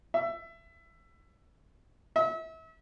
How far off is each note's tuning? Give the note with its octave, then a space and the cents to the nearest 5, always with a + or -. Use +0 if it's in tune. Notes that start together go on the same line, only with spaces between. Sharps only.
E5 +20
E5 -35